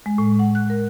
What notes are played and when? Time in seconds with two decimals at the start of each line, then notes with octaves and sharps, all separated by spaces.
0.06 G#3
0.18 A2
0.39 F#5
0.55 F#6
0.70 A#4